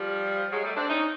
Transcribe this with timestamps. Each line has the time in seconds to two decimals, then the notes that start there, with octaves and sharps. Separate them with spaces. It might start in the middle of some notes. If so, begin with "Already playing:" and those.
Already playing: F3 G3
0.53 F#3 G#3
0.64 G3 A3
0.77 C4 D4
0.89 C#4 D#4